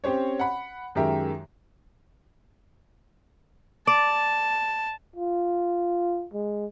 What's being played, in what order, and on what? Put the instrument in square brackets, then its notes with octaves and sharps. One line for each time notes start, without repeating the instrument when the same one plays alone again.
[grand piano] C4 C#4 G4 C5 C#5
F#5 B5
F#2 D#3 G#3 G4 A#4 E5
[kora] D5 [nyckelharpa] A5
[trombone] F4
G#3